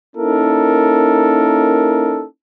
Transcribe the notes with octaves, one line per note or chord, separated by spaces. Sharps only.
A#3 C#4 D#4 E4 A4 A#4